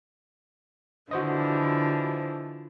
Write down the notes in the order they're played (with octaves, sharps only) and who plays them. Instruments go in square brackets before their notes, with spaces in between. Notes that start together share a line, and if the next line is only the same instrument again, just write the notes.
[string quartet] D3 E3 F3 [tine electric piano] F#4 C5 D#5